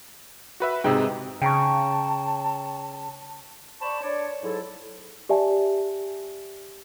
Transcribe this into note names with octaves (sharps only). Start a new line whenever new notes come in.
F#4 B4 E5
G#2 C3 G#4 G5 E6
C#3 G5 A5 A#5 C#6
C5 D5 A5 B5 C#6
D4 C#5 D5
G#2 F#3 E4 A4
G4 D5 E5 G#5 A5